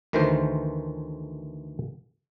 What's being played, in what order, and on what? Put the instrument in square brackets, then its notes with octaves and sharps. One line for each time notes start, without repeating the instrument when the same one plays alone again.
[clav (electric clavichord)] D2 D#3 E3 A3 A#4 C5